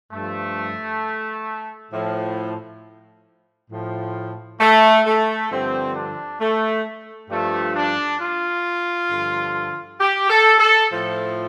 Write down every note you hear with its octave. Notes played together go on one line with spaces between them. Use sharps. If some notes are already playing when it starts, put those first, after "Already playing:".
G2 F3 A3
A2 F3
A2 F3
A3
A3
G2 D3 F3 C4
D4
A3
G2 F3 A3
D4
F4
G2 D3 F3
G4
A4
A4
A2 F3